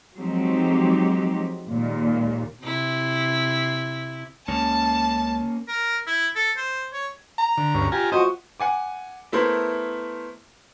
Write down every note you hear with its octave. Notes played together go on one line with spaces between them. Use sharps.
F3 F#3 G#3 C4 D#4 G4
D#2 A#2 G#3
C3 E4
C#2 A#3 C#4 A5
A#4
E4
A4
C5
C#5
A#5
D3
D2 G2 C#4
F4 G4 G#5 A#5
F4 F#4 C5 D#5 C#6
F#5 G#5 D6
A3 B3 E4 A#4 C5